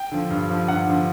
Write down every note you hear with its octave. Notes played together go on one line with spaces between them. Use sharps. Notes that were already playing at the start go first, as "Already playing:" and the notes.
Already playing: G5
D3 F3
G2
D3 F3
G2 F#5
D3 F3